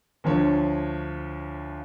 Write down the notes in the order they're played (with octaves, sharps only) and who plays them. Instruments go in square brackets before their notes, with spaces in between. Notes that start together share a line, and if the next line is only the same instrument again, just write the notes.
[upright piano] D2 F3 C#5